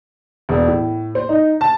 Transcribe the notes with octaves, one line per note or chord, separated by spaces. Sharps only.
E1
A2
C5
D#4
A5